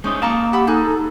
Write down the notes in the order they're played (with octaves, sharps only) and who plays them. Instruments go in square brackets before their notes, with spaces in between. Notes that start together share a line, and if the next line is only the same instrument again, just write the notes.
[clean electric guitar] G#3 C#4 D#4 [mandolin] C5 [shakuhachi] D#6
[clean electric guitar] A#3 A5 [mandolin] F5 A#5 C#6
[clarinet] G4 [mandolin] F#5 B5 E6
[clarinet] D#4 [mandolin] G#4 F#6 G6 [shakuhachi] A4